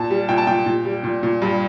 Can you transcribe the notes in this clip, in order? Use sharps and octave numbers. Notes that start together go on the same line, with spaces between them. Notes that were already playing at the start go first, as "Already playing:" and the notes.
Already playing: A#2 A5
G3
A#2 G5
A5
A#2 G5
A#2
G3
A#2
A#2
G2